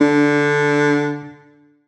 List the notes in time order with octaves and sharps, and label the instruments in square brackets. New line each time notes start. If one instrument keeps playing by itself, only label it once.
[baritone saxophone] D3 [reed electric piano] D4